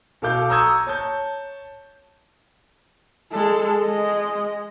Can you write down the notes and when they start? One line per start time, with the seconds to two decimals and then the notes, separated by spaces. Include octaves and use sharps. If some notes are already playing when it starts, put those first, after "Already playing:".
0.22 B2 A4 F5 D6 G6
0.50 A#5 C#6 D#6 E6 G6 G#6
0.87 C#5 A5 G6
3.32 G#3 A4
3.81 G#3 D#5